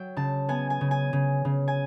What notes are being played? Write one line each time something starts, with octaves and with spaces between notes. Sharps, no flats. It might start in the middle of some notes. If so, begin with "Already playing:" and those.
Already playing: F#3 G5
C#3 A5
B3 G#5
G#5
C#3
G#5
C#3
C#3
G#5